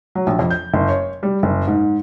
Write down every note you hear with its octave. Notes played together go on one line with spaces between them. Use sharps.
F#3
A#1
F2
G6
F#1
C#5
G3
F#1
G#2